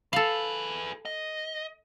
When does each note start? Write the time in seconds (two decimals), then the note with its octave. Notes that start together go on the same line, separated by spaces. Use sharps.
0.13 G#4 A4 B4 F5
1.05 D#5